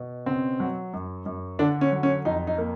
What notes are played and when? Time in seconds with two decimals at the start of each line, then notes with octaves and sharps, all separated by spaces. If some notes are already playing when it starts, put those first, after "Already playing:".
Already playing: B2
0.26 C#3 C4
0.60 F#3
0.93 F#2
1.26 F#2
1.59 D3 D4
1.81 C#4
1.92 F#3
2.03 C#4
2.25 F2 D#4
2.47 D#4
2.58 A#3